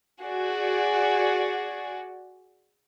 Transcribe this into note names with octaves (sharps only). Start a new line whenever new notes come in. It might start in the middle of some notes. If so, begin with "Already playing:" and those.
F#4 G#4 D5